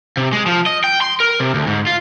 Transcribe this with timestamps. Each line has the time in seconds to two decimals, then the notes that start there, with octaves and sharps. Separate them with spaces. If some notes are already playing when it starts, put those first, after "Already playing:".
0.17 C3
0.33 G#3
0.46 F3
0.66 D#5
0.84 G5
1.01 C6
1.20 A#4
1.40 C3
1.55 D2
1.67 G#2
1.87 F4